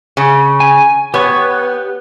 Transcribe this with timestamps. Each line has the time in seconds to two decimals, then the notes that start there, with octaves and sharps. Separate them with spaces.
0.17 C#3
0.60 G#5
1.14 B3 G4 C#5 C#6